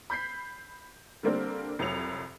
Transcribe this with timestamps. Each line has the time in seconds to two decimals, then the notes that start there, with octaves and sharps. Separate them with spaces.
0.10 B5 G6 B6 C7
1.23 D3 G3 A#3 C4 D4
1.79 C2 F2 F#3 C#7 F7